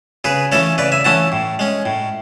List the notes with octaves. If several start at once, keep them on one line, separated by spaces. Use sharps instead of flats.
C#3 G#4 B4
E3 A3 C#4 A4 C#5
C#3 B4 D5
E5 G#5
E3 A3 C#4 F#5 A5
A2
G#3 C#4
A2